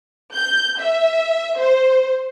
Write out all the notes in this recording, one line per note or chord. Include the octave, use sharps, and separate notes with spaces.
G6
E5
C5